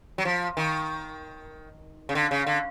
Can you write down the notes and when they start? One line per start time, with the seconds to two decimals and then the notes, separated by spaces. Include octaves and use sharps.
0.18 F#3
0.25 F3
0.57 D#3
2.09 C#3
2.15 D3
2.31 C#3
2.47 D3